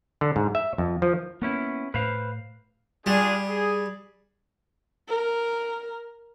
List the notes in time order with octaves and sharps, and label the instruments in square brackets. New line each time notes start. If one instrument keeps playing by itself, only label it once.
[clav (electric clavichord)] D3
G#2
E5
F2
F3
[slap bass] A#3 [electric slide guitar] B3 C#4 E4
[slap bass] A2 [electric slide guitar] B4 C5 F5
[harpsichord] G3 [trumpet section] D4 F4 G#4
[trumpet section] G#4
[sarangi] A#4